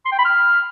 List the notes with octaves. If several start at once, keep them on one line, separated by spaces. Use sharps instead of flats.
C6
G5
B5
F6